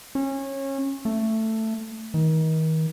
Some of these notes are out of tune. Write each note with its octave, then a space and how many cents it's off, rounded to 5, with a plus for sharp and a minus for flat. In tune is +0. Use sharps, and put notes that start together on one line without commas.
C#4 -25
A3 +10
D#3 +35